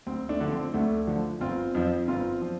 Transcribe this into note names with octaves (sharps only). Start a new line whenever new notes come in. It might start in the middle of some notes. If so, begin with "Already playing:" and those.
D2 C4
A3 D4
D3 F3
C4
D2 A3 D4
D3 F3
G1 C4 F4
F2 F3
G1 C4 F4
F3